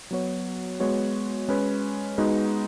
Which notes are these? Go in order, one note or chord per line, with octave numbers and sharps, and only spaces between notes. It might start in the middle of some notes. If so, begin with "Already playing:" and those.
F#3 B3 F#4 C#5
G#3 B3 F#4 C#5
G#3 C#4 B4
G#3 B3 D#4 F#4 B4